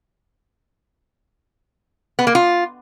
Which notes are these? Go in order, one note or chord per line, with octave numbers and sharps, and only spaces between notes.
B3
A#3
F4